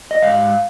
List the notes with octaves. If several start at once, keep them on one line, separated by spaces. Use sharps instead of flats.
D#5
G#2 F5